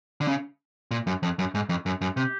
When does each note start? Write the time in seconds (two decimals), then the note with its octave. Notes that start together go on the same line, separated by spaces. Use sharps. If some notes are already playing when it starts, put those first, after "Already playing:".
0.21 D3
0.28 C#3
0.91 A#2
1.07 F#2
1.23 F2
1.39 F#2
1.55 G#2
1.69 F2
1.86 F#2
2.01 F#2
2.17 C3 G4